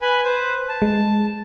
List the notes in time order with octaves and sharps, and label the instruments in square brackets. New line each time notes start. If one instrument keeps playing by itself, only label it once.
[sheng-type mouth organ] B4 G#5 B5
B4 C5
A5
[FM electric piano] G#3